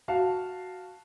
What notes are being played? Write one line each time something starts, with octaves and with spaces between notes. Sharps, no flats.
F#4 F5 A5